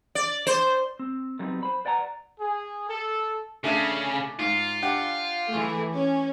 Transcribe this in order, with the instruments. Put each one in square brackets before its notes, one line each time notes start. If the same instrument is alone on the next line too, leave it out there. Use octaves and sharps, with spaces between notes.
[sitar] D5
C5
[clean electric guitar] C4
D3 F#3 G3 B3 C4 D#4
C5 B5
B4 D5 F#5 G5 A#5
[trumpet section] G#4
A4
[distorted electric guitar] C#3 [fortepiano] A3 D4 G#4
[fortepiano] G#2 [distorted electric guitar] F4
[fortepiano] D4 G4 F#5
[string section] E3 A3 G#4
C#4